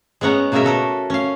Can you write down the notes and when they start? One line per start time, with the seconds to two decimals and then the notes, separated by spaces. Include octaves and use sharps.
0.21 G#3 B3 C#4 F#5 A#5
0.52 B2 A#3 C#4 G#4 A#4 E5
0.64 F#4 A4 A#4
1.10 C#4 F5